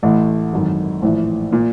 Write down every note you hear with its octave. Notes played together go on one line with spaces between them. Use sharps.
A1 A2 E3 A3
G#1 F#2 D#3
A#1 A2 E3
A#2